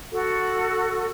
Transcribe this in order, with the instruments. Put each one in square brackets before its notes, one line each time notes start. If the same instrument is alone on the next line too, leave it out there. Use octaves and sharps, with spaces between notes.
[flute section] F#4 A4